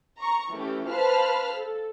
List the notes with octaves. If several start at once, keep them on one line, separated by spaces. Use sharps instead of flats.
A#5 C#6
E3 A3 C#4 G4
B4 C5 F5 A5 B5 F6
A4